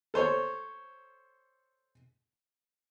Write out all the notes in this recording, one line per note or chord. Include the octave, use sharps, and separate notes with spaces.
A4 C5 C#5